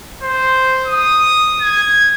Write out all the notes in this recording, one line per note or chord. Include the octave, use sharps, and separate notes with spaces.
C5
D#6
G#6